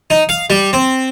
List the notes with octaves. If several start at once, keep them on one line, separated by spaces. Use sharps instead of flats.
D#4
F5
G3
C4